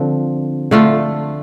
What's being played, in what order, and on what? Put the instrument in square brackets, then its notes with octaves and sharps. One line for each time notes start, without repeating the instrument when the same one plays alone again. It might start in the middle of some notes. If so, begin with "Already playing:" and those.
Already playing: [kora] D3 F3 C4
D3 A3 F4